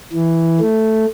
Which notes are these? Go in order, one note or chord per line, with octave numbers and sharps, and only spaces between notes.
E3
A3